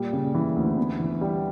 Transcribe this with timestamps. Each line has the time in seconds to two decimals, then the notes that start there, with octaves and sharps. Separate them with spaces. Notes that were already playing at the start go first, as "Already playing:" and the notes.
Already playing: A#2 G3
0.13 C#3
0.34 E3
0.56 D2
0.77 B3
0.99 E3
1.21 G3